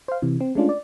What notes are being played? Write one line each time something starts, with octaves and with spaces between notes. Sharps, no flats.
C5 F5
C3 E3
C4
G#3 A3 C#4 D4 F4
D5